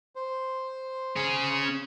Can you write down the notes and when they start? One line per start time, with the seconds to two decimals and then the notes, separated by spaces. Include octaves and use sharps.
0.15 C5
1.16 C#4 G#4